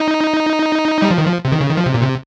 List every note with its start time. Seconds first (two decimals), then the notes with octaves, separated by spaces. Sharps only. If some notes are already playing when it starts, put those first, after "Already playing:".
Already playing: D#4
1.02 G3
1.11 F3
1.18 D#3
1.26 F3
1.45 C3
1.52 D#3
1.61 C#3
1.69 D#3
1.77 F3
1.86 C3
1.94 A#2
2.03 C3